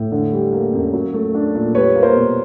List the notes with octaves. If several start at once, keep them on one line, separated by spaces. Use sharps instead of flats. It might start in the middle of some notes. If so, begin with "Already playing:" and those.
Already playing: A2
D3
G3
A#3
F#2
F#3
A3
D4
A#2
G3 B4 C#5
A#3
A#4 C5
B2